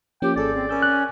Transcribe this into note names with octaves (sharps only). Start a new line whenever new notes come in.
F3 A#3 C#4 G4 G5
G#1 G#4 A4 D5
C4
C#4 A#4 E6 G6
F#6